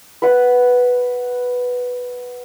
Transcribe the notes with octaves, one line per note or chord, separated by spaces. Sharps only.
B4 F#5